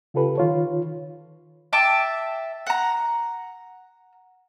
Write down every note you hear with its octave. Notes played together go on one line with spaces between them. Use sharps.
C#3 F4 G4 A4 B4
D#3 F4 C#5
E5 G5 A5 D6
F#5 A#5